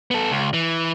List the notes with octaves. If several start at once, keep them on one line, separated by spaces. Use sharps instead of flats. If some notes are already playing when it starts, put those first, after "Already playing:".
B3 A4
C#2
E3